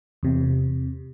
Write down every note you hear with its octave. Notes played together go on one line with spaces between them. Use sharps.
E2 C3